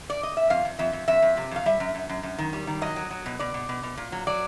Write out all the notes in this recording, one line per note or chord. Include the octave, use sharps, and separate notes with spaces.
D5
D#5
E5
F2 F5
F2
F2 E5
F2
F2 E5
F2
C3
F2 F5
G3 E5
F#2
F#2
F#2
F#2
D#3
G3
D#3
F#3 D#5
F#3
F#3
B2
B2 D5
B2
B2
B2
A#2
F#3
F#3 D5